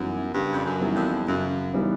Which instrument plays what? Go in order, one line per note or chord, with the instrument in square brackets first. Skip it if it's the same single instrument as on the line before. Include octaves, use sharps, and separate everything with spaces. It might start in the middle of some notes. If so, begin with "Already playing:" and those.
Already playing: [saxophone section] F#2 [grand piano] E3 G3 B3 D#4
[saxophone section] G2 [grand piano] C#3
[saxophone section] F2
F#2
[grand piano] E3 G3 B3 D#4
[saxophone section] F2
[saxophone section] F#2 [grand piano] C#3
[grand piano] E3 G3 B3 D#4